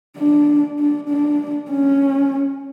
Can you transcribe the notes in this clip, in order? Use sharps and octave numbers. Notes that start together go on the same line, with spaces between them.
D4
D4
D4
C#4